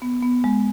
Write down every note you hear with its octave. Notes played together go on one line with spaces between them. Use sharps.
B3
B3
G#3